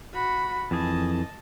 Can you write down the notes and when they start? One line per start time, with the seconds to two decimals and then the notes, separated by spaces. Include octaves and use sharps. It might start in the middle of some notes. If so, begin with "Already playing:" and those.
0.14 F#4 B5
0.71 F2 E3 G#4 D#5 A5